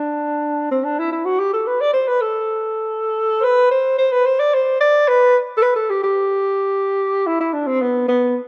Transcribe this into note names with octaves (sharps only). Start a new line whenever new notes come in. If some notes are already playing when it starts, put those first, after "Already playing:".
Already playing: D4
C4
D4
E4
E4
F#4
G4
A4
B4
D5
C5
B4
A4
C5
B4
C5
C5
B4
C5
D5
C5
D5
B4
A4
B4
A4
G4
G4
E4
E4
D4
C4
B3
B3